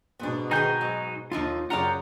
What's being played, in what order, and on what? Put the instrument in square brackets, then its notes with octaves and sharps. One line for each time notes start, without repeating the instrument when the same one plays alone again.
[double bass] G#2 B2 [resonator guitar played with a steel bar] B3 D4
[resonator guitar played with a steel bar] D#3 B3 G#4 [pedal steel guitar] D#4 G#5 G6
[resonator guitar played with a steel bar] F#3
[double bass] D#2 [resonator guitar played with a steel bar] D3 F3 D#4 [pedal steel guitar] F4
[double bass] F#2 C#3 [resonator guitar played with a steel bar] F4 G4 D5 [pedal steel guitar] F#5 A#5